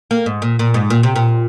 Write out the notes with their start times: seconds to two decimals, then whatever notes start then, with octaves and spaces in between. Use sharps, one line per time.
0.11 A#3
0.26 G#2
0.42 A#2
0.59 A#2
0.74 G#2
0.90 A#2
1.03 C3
1.16 A#2